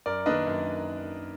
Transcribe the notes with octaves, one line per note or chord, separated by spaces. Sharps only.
F#2 A#4 D5
D#3 A#3 D4 B4 D#5
F#2